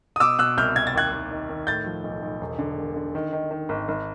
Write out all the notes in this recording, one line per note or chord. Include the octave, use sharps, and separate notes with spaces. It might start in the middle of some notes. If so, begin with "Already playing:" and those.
D#6
B2 D6 E6
B2 E6 F#6
C2 F6 G6
C2 G#6
A6
D#2 F#6 G#6
D#2
D#3
D#3
A2 G6 A6
F3
B1
B1
E1
D3
E1
D3
D#3
D#3
D#3
G#1
G#1